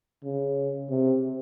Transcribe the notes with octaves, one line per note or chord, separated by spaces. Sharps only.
C#3
C3